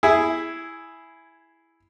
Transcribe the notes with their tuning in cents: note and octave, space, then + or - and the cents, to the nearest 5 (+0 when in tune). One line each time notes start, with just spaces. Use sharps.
E4 +0 G#4 +0 G#5 -45